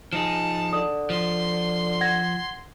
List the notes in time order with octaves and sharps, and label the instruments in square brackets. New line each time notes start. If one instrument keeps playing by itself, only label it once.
[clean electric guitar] F3 D#4 G#4 [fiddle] A5 [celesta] E7
[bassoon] D3 [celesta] D#6
[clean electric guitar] F3 [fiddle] C6
[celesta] F#5 G#6 A#6